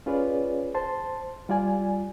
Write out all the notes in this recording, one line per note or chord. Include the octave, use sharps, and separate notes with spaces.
C#4 F4 G#4 B4 C#5 D5
C5 A5 C6
G3 F4 D5 G#5